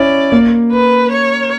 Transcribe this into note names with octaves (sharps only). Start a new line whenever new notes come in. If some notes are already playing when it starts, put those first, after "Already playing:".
Already playing: C#4 E4 D5
A#3
B4
C#5